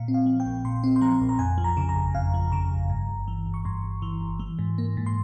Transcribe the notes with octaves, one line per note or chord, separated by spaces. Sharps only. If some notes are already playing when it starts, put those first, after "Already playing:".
Already playing: A#2 F5
C4
F5
F3
G5
A#1
A#2 C6
C4
C6
F3 A#5
A#1
A#5
F2 G#5
F3
A#5
C#3
A#5
G1
F2 F5
F3
C#3 A#5
G1
G2
G1
E3
G1
C#6
G2 C6
G1
E3
G1
E3
G#2
A#3
G#2
C6